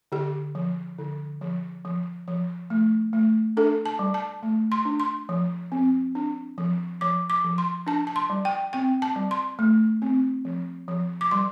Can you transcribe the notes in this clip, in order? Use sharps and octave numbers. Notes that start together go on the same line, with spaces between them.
D3 G4
F3
D3
F3
F3
F3
A3
A3
D4 A4
A5
G3
A5
A3
C6
D4
C6
F3
C4
D4
F3
F3 D6
D6
F3
C6
D4 A5
A5
C6
G3
G5
C4 G5
A5
G3
C6
A3
C4
F3
F3
D6
G3 C6